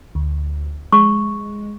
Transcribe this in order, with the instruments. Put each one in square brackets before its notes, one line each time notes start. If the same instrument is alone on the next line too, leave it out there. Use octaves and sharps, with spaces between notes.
[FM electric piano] D2
[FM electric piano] G#3 [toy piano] C#6